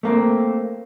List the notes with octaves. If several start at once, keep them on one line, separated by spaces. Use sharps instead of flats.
A3 A#3 C4